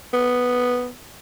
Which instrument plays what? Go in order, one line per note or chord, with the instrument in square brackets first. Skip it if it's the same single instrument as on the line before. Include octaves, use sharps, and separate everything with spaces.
[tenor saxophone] B3